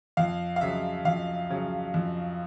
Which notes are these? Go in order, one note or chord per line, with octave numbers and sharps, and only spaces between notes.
F2 F5
F5
C#3 F#3 E5
F2 F5
C#3 F#3
F2